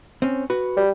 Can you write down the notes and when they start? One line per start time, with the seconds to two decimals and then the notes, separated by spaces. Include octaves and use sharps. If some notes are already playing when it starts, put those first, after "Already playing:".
0.22 C4 C#4
0.50 F#4 B4
0.77 G3